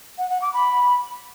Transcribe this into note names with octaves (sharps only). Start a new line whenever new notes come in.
F#5
F#5
D6
B5